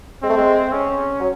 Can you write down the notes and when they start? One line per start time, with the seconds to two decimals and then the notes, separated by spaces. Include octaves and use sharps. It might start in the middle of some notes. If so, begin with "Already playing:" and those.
0.22 G#3 C4
0.29 A3
0.37 G#3
0.72 C#4
1.20 F#3